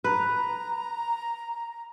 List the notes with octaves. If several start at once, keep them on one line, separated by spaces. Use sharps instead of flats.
B4 A#5